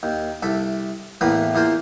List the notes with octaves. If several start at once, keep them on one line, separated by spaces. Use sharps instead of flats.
D#2
C2 A4 E5
E2 A2 A#3 B4
E2 A#3 F4 C5